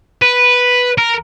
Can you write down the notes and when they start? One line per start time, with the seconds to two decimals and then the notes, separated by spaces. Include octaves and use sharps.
0.22 B4
0.98 A#4